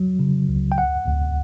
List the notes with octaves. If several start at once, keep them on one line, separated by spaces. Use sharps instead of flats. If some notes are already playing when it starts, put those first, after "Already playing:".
Already playing: F#3
C#3
C#2
G5
D2 F#5
D2